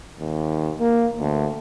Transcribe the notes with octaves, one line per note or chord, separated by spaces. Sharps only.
D#2
A#3
D2